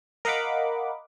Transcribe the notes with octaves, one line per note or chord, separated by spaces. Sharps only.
A#4 D#5 F5 F#5 B5 D6